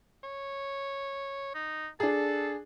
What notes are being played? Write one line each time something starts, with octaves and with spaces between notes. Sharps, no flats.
C#5
D#4
D4 G#4 A4